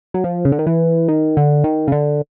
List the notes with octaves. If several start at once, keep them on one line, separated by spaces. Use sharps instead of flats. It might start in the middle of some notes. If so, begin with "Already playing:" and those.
F#3
F3
C#3
D3
D#3
E3
D#3
D3
D#3
C#3
D3